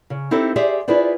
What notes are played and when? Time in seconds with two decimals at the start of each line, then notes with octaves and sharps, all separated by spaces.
0.10 C#3
0.31 C4 D#4 E4 G4 A4 C5
0.56 G4 G#4 C5 D5 E5
0.88 E4 F4 G#4 B4 C5 D5